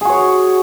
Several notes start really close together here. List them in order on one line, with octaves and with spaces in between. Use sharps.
G#4 F#4 C#5